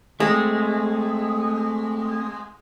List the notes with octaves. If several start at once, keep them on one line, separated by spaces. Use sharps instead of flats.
G#3 A3 C4